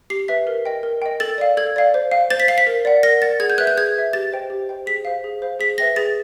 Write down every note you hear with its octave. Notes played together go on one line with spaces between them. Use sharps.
G4 C7
B4 E5 B6
A#4
D#5 G5
A#4
D#5 G5
A4 A6
D5 F5
A4 G#6
D5 F5
C5
F5
C5 A6
B6
F5 C7
B6
A#4
D5 F#5
A#4 A#6
D5 F#5 A6
G#4 G#6
G6
B4 E5 F#6
G6
G#4 G#6
B4 E5
G4 A6
C5 D#5 G5
G4
C5 D#5 G5
G#4 B6
C5 F5
G#4
C5 F5
G#4 B6
B4 E5 G5 A#6
G#4 A6